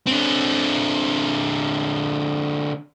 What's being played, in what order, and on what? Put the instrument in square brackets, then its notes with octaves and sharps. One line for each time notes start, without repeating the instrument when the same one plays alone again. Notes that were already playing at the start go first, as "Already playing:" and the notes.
[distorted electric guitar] D3 C4